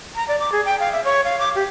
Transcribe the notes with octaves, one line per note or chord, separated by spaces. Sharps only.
A#5
D5
D6
G#4
G5
F5
E5
C#5
F5
D6
G4